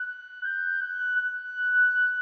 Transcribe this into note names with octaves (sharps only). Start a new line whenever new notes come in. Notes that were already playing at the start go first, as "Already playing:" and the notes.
Already playing: F#6
G6
F#6
F#6